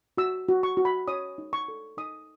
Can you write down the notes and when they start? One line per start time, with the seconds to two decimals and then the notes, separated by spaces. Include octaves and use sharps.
0.18 F#4 E6
0.48 F#4
0.63 C#6
0.77 F#4
0.85 B5
1.08 C#5 D#6
1.38 D#4
1.53 C#6
1.68 A4
1.97 D#4 D#6